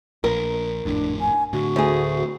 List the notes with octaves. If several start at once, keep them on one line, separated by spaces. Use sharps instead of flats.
A#1 A#4
G#1 F2 A2 D4
G#5
A2 D3 F#4
D2 G#4